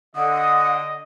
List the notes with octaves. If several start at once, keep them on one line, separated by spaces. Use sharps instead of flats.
D3 D#5 F#5 D#6